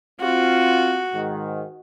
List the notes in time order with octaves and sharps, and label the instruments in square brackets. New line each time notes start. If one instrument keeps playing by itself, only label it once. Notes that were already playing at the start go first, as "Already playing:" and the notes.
[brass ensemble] C4 F4 [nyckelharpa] F#4
[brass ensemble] G#2 D#3